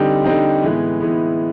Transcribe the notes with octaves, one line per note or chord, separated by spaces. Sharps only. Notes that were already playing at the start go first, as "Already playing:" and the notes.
Already playing: D3 G3 C4 D#4 G4
D3 G3 C4 D#4 G4
A2 E3 G#3 B3
A2 E3 G#3 B3